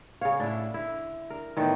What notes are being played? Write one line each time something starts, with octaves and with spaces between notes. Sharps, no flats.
C#3 C#5 F5
A2 D4 E4
D3 E4
A#4
A2 D#3 E3 G3 B3 D4